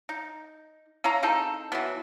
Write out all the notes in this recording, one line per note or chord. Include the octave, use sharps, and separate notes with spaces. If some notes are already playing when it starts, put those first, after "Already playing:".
D#4
C#4 E4 F5 A#5
C4 D#4 G#4 A4
E3 F#3 B3